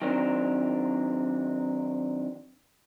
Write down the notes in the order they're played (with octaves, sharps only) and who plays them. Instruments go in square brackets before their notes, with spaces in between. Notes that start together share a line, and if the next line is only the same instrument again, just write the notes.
[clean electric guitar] D#3 F#3 C4 D4 A#4